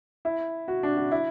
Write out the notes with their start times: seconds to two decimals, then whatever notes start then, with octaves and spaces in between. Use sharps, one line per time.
0.25 E4
0.68 F#4
0.83 D4
0.97 F#4
1.11 E4